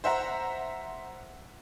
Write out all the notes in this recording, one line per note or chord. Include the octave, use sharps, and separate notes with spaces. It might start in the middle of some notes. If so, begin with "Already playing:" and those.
C5 E5 F#5 A#5